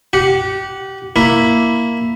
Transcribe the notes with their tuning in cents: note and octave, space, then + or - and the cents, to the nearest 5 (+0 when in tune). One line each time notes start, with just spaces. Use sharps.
G4 -20 F#5 +0
A#3 +0 E4 +0